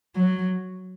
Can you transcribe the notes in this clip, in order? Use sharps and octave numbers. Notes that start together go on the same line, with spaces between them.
F#3